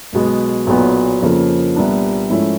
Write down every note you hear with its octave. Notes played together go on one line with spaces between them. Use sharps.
B1 B2 G#3 B3
B1 A#2 F#3 B3
F2 C#3 F3 A#3
C2 A#2 G3 B3 D4
G#2 F3 A3 C#4 E4